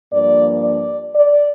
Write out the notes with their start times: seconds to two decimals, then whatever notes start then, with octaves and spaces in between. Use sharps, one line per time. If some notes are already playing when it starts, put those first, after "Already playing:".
0.12 G2 F3 A#3 D5
0.63 D5
1.15 D5